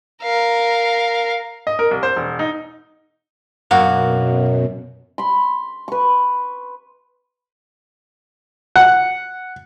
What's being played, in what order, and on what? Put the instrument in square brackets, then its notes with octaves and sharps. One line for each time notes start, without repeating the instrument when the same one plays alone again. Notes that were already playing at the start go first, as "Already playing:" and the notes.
[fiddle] A#4 F5
[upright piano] D#5
A#4
C2
C5
E1
D#4
[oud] F#2 [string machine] B2 [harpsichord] A#3 F#4
[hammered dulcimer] B5 C6
B4 C#6
[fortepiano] F#5